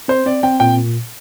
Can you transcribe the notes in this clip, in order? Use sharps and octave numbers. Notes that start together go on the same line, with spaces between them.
C4 C5
C4 D5
C4 G5
A#2 G5